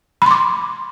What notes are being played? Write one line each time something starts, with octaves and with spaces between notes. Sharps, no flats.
B5 C6 D6